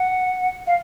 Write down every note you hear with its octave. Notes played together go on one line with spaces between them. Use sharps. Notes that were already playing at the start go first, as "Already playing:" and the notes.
Already playing: F#5
F5